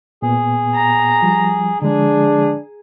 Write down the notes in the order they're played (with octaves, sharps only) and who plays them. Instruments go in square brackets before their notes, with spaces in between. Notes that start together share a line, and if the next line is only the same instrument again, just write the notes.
[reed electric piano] A#2 B3 [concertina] G#4
[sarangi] A#5
[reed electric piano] F3 G3
[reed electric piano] D3 F3 G#3 [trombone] D4 [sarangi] G#4